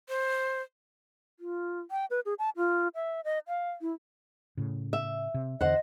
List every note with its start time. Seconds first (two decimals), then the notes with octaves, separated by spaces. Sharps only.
0.09 C5
1.40 F4
1.91 G5
2.10 B4
2.26 G#4
2.39 A5
2.57 F4
2.95 E5
3.24 D#5
3.48 F5
3.81 E4
4.57 A2 C#3
4.93 E5
5.34 C3
5.61 E2 D3 C5 D#5 F#5